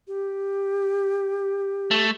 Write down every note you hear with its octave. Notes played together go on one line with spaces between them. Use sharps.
G4
A3